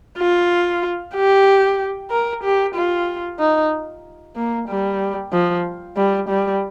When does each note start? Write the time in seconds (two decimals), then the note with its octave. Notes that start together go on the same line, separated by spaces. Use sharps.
0.18 F4
1.15 G4
2.11 A#4
2.43 G4
2.75 F4
3.39 D#4
4.36 A#3
4.68 G3
5.32 F3
5.97 G3
6.29 G3